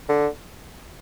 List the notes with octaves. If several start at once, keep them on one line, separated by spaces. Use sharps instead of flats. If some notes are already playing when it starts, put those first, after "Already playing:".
D3